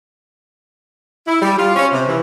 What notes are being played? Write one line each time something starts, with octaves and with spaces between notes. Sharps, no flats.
E4
G3
F4
C#4
C3
E3